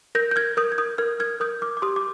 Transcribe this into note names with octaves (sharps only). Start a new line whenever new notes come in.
A#4 G6 A#6
G6
F6 G#6
A#4 D#6 G6
G#6
D#6 G6
A#4 F6 G#6
F6 G#6
A#4 D#6 G6
D6 F6
D6
G4 C6 D#6
D6